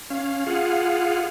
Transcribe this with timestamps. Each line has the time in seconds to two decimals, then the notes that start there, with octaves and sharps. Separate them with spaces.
0.10 C#4 F5
0.47 F4 G#4 F5 F#5